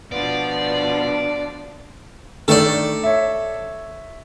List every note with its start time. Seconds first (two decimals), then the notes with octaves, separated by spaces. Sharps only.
0.12 B2 F3 B3 D4 F4 D5
2.48 D#3 A3 D4 A4 D5
3.04 C#5 E5